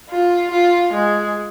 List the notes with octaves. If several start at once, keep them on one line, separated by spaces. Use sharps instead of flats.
F4
F4
G#3